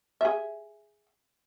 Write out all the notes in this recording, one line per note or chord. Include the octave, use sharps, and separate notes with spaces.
G#4 E5